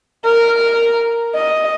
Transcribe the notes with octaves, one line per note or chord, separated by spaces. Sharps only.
A#4
D#5